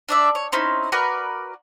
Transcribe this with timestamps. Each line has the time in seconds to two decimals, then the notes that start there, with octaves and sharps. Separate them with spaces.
0.09 D4 D5 E5
0.35 C#5
0.52 C4 C#4 D#4 E4
0.92 F#4 A#4 B4 D5